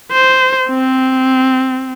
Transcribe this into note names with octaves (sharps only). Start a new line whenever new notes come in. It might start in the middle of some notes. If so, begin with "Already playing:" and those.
C5
C4